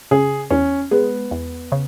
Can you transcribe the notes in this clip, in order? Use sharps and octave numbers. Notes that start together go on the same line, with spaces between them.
C#3 G#4
E2 C#4
G#3 B3
E2
C#3